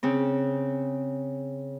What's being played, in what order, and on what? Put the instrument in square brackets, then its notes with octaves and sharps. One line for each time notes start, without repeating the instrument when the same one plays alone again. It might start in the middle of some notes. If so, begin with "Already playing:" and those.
[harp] C#3 C4